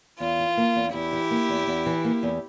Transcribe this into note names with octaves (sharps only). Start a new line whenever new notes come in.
E2 F4
E3
A#3
E2
E2 E4 G4
E3
A#3
E2
E2
E3
A#3
E2